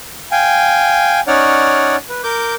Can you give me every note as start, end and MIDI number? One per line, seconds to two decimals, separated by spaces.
0.32 1.20 77
0.32 1.20 79
0.32 1.20 80
1.27 1.96 61
1.27 1.96 63
1.27 1.96 73
1.27 1.96 74
1.27 1.96 78
1.27 1.96 89
2.10 2.21 71
2.24 2.55 70
2.24 2.55 86
2.24 2.55 91